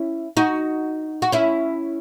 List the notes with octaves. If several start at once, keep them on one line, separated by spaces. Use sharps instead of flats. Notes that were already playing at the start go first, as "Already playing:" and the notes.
Already playing: C#4 E4
D#4 F#4
F#4
C#4 E4